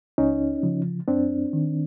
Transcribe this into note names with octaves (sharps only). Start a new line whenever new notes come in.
C#2 C#4 D#4
C#3 F3
F#2 C4 D4
D#3